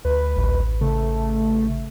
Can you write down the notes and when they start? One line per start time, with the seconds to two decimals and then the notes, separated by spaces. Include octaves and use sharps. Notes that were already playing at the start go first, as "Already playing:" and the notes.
0.05 D2 B4
0.36 A1
0.81 C#3 A3